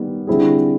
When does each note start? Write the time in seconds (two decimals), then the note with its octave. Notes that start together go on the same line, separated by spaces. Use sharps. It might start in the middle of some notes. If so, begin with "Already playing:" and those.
Already playing: D#3 G3 B3
0.27 D3 G3 C4 E4 G#4